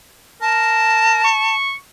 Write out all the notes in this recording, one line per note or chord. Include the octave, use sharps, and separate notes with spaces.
A#4 A5
C#6